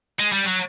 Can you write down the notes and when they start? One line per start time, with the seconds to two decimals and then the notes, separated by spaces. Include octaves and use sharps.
0.19 G#3
0.32 G3
0.45 F#3